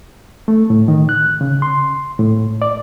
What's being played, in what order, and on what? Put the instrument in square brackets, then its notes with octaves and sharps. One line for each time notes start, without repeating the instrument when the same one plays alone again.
[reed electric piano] A3
A2
D#3
F#6
C#3
C6
A2
D5